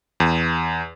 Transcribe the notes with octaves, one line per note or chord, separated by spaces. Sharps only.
E2